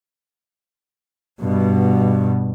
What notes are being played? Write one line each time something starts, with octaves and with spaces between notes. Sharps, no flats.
G2 B2